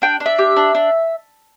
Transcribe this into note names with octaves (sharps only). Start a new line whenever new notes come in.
D4 G5
D4
E5
G4
D4
D4